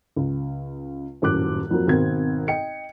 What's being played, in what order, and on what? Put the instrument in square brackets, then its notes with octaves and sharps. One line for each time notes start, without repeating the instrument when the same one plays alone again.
[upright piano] C#2
D#1 F#2 A2 D6 F#6
F2 F#3 A#3
G#1 B2 C4 A#4 G#6
D#5 G5 C#7